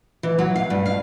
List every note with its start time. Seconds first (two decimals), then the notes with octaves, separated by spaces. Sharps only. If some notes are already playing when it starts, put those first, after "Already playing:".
0.23 E3
0.39 F#3
0.56 F5
0.70 G2
0.86 F5